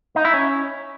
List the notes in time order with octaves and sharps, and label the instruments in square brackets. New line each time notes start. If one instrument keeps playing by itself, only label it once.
[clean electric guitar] D#4
E4
C#4